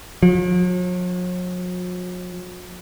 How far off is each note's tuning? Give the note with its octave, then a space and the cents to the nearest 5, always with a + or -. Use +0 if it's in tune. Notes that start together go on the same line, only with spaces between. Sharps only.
F#3 -45